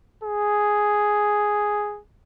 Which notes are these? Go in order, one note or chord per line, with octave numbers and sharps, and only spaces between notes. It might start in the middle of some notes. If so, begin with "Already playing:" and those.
G#4